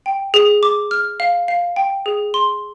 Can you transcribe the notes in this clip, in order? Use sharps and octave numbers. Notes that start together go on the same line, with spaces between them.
G5
G#4
D6
F6
F5
F5
G5
G#4
C6